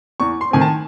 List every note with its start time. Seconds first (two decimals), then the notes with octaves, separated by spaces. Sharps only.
0.20 E2 C#6
0.41 C6
0.51 D#3 A3 C4 G#5
0.61 A5